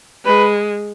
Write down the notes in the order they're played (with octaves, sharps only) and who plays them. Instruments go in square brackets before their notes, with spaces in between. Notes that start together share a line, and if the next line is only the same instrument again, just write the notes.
[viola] G#3 [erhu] B4